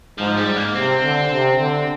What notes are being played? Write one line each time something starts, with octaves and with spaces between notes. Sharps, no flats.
G#2 F3
G3
G#2
A#3
C3 C4
D3
C3
D3